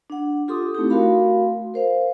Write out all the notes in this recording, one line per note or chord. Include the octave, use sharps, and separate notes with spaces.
D4 F#5
F4 G4 A4 C6 D6 D#6
A3 C4 D#4 E4 G4
A3 F#4 A#4 F5 B5 C6
A#4 C5 F5